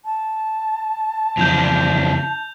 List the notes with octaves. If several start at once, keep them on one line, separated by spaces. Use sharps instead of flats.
A5
F2 C#3 E3 G6 F7